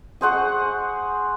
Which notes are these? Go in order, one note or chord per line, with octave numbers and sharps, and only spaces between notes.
G#4 C5 F#5 C#6